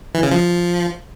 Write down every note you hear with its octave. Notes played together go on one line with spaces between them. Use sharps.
E3
C#3
F3